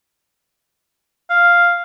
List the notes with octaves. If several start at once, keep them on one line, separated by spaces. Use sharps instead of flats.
F5